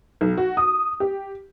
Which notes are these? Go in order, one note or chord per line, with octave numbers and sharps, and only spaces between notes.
B1
F#4
D#6
G4